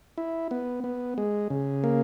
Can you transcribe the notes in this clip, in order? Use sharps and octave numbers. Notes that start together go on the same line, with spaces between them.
E4
B3
B3
G#3
C#3
A#3